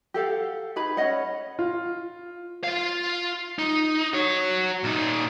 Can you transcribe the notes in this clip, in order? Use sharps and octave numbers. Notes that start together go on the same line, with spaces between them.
G4 A4 F5 F#5
D#4 G#4 B4 B5
C#4 C#5 D#5 F#5
F4
F4 F5
D#4
F#4 C#5
A#2 D#4